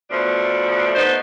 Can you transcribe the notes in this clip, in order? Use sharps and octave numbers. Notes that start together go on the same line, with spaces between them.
B2 F3 A3 D4
A3 B3 D#4 C5